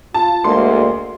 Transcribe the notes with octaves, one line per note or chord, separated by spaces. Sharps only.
F4 A5
D2 G#3 A#3 C6